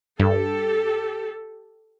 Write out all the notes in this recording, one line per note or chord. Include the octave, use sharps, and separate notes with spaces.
G2 G4 A4